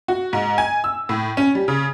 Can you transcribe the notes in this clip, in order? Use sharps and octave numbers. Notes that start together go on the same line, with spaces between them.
F#4
G#2
G#5
E6
A2
C#4
G3
C#3